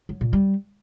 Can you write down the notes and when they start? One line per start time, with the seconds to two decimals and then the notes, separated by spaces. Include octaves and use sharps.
0.09 F#3
0.21 A#2
0.33 G3